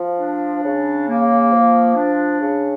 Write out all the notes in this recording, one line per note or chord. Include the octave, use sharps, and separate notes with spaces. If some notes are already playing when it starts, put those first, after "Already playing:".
Already playing: F3
D4
C#3
A#3
F3
D4
C#3